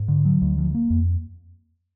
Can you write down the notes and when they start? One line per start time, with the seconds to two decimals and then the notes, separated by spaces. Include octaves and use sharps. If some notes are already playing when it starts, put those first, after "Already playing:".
Already playing: G#2
0.08 D3
0.25 F#3
0.42 D2
0.58 F3
0.74 A#3
0.90 F2